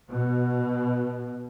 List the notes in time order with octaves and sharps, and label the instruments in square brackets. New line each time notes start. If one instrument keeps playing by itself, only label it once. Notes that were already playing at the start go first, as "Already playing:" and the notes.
[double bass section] B2